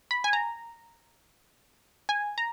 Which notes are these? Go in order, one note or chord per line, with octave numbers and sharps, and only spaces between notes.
B5
G#5
A#5
G#5
A#5